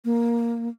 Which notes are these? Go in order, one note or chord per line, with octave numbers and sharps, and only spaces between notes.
A#3